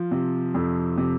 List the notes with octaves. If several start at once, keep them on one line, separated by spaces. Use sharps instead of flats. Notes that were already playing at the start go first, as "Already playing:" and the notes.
Already playing: F3
C3
F2
C3